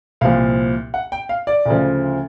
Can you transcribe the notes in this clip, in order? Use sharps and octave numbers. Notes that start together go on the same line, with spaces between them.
C2 A#2 F3 F5
F#5
G5
F5
D5
D2 C#3 F3